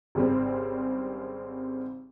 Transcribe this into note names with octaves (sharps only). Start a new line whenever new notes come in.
G#1 C#3 G3 C4